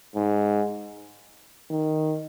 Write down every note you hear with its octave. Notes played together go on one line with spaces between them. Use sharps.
G#2
D#3